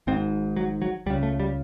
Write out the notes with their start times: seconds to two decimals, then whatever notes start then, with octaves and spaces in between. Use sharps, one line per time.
0.07 G#1 G#2 C4
0.56 F#3
0.82 F#3
1.06 C#2 G3
1.10 C#3
1.23 A3
1.40 G3